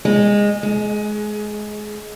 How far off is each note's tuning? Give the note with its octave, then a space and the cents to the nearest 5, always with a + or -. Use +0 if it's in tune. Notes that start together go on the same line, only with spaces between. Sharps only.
G#3 -15
G#3 +20